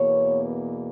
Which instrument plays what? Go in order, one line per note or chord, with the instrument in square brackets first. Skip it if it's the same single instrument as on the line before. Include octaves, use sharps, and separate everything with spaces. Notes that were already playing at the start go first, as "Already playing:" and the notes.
Already playing: [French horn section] E2 B2 A#3 C#5